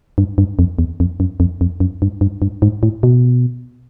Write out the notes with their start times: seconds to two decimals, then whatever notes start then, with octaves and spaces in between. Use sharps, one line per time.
0.18 G2
0.38 G2
0.59 F2
0.79 E2
1.00 F2
1.20 F#2
1.40 F2
1.61 F2
1.80 F#2
2.02 G2
2.21 G2
2.42 G2
2.62 G#2
2.83 A2
3.03 B2